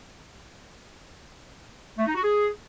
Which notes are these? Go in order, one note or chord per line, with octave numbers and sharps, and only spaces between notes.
A3
D#4
F#4
G#4